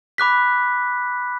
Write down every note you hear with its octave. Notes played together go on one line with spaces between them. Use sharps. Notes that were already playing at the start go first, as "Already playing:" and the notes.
B5 D6 F#6 B6